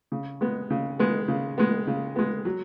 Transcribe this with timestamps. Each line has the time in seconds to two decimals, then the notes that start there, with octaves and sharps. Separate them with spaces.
0.12 C#3
0.41 G#3 B3
0.70 C#3
0.99 G#3 B3
1.28 C#3
1.58 G#3 B3
1.87 C#3
2.16 G#3 B3
2.45 F#3